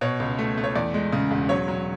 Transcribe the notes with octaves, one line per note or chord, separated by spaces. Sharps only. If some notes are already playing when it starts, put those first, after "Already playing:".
B2 C#5
C#2
A3
A3
C#5
E2 D5
G#3
C#3
E1
F#3 C#5
F#3